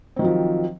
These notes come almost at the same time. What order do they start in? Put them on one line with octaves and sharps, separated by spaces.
C4 D#3 F#3 F3